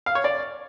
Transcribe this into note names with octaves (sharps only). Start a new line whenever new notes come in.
F5
C#5
D5